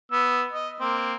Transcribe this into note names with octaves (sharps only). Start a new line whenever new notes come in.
B3 E6
D#5
A#3 C4